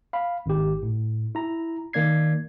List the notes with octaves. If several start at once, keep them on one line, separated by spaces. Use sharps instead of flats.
F5 B5
G#1 G4
A2
E4 A#5
D#3 A#3 D5 G#6 C7